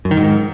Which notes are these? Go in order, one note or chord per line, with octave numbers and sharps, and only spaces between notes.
F#2
D#3
G#2